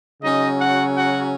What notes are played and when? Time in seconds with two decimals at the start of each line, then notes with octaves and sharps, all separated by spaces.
0.22 C#3 F#3 C#4 D#4 D#5
0.59 F#4 F#5
0.95 F#4 F#5